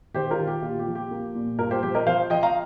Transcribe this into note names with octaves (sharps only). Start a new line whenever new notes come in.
D#3 G4 C5
F4 A#4
D#3
G4
A#2 F4
G4
F3
G4
A#3
A#2
G2 F4 A#4
G4 C5
F3 G4 C5
A#4 D#5
F3 C5 F5
F3 D#5 G5
F5 A#5